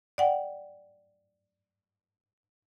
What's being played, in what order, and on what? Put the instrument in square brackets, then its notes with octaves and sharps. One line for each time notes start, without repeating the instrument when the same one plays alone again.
[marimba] D5 F#5 G5